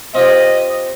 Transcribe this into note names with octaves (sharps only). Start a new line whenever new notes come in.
C4 F4 G4 D#5